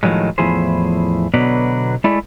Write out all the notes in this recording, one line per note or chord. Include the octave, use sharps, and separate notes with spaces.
A2 D#3 F3 F#3 G#3
E2 A2 F3 E4 G#4 C5
B2 D3 F#3 B3 B4 D5
G#3 A3 E4 G#4 D5